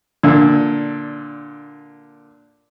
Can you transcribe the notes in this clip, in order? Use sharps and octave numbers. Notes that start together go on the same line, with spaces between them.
A#2 D3